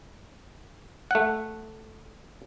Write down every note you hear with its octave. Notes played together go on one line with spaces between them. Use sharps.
A3 F#5